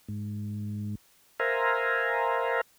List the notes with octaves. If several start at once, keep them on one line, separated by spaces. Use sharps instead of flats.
G#2
A#4 C5 E5 F5 G#5 A#5